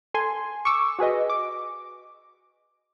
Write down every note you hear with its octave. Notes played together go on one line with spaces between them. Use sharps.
A4 G#5 C6
C#6 D6 E6
F#4 G#4 B4 D#5
D6